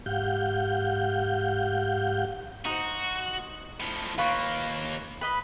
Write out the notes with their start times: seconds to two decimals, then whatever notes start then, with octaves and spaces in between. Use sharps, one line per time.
0.06 G#2 G4 F5 F#5 G6
2.65 D#4 F#4 C5
3.80 A2 F3
4.18 D#2 A#3 F4 B4 C#6
5.21 B4 D#5 B5